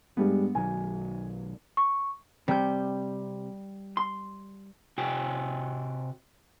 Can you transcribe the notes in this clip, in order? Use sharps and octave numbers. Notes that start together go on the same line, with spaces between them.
G2 G3 G#3 B3
B1 D#3 F#3 G#5
C#6
C3 G3 G6
C6
C3 F#4 G5 G#5